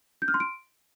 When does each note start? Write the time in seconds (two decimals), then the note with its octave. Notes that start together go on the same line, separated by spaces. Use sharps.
0.22 G6
0.28 F6
0.34 C6
0.40 D7